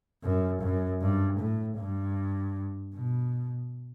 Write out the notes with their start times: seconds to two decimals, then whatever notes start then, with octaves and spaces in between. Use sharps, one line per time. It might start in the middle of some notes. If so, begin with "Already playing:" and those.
0.24 F#2
0.62 F#2
1.01 G2
1.39 A2
1.78 G2
2.94 B2